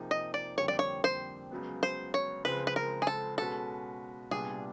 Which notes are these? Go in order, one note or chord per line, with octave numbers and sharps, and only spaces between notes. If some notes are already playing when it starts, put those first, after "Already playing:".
Already playing: C3 F3 A#3 D#4 G#4
D#5
D5
F2 D3 G3 A#3 C#5
D5
C#5
C5
C#2 C#3 F#3 B3
C5
C#5
C#2 C#3 F3 G#3 C4 B4
B4
A#4
G#4
A4
B2 G#3 C#4 F#4 A4 B4
C2 A#2 G3 B3 D4 G#4